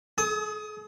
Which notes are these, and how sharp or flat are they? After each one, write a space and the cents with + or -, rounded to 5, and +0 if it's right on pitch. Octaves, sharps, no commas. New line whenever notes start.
G#4 +45 D#6 +20